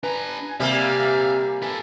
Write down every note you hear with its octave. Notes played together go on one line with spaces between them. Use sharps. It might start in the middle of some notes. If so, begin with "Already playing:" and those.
D4 B4 G#5 A#5
C3 G3 A#3 E5 F5
A4 B4 G#5